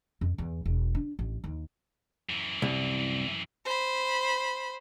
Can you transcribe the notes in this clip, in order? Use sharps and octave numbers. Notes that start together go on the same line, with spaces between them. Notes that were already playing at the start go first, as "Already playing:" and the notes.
F2
E2
E1
D4
A1
D#2
F#2 E3
C2
C5 B5